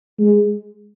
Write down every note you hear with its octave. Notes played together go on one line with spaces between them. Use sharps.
G#3